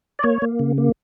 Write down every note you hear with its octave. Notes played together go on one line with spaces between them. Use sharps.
D5
A#3 C#5
A#3
C#3
A#3